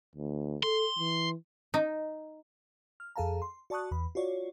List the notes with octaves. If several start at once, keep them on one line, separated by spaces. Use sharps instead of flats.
D2
A4 C6
E3
D#4
F6
F2 G#4 A4 F5 A5 A#5
C6
F#4 D5 A5 C#6 D#6 F#6
E2 B5
F4 F#4 C#5 D5